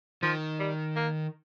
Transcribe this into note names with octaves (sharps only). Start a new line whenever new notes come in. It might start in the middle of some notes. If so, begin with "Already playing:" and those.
D#3 F3
G3
A#3